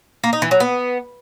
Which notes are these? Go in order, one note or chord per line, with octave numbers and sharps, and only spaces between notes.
A#3
D#4
E3
F#3
B3